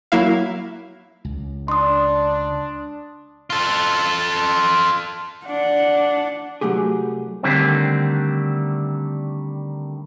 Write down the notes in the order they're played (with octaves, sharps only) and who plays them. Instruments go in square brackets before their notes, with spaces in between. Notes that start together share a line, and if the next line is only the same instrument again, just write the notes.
[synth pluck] F#3 A#3 E4 F5
[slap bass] C#2
[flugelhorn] D4 [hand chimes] C6 D#6
[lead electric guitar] F4 A4
[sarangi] D4 [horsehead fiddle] F#5
[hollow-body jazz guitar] C2 F#3 A3 G4 G#4
[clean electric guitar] D3 D#3 G3 A3 C4